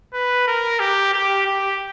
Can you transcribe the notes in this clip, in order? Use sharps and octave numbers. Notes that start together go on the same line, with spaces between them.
B4
A#4
G4
G4
G4